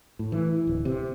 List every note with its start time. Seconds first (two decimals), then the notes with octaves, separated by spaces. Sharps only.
0.19 A2
0.32 E3
0.67 D1
0.85 C3